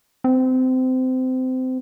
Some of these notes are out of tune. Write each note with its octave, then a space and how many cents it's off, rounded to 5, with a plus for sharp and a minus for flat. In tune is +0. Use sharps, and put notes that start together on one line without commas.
C4 -25